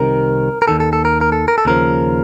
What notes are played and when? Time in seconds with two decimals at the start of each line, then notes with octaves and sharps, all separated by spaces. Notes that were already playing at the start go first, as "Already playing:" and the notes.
Already playing: C2 C3 D#3 A#4
0.62 A#4
0.68 D#2 D#3 A4
0.80 A4
0.93 A4
1.05 A#4
1.21 A#4
1.32 A4
1.48 A#4
1.58 A4
1.65 D#2 C#3 F3 A#4